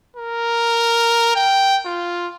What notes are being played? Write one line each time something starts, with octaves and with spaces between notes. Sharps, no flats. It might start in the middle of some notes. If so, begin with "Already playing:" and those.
A#4
G5
F4